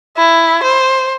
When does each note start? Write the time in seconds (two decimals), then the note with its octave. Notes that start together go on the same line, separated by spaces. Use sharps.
0.17 E4
0.63 C5